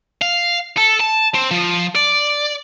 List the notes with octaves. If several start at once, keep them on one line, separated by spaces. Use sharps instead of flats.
F5
A4
A5
C4
F3
D5